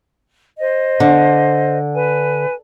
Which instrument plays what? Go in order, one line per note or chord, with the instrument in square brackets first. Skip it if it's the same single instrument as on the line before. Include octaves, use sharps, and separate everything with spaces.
[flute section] C5 D#5
[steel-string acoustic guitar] D3
[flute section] B4 G#5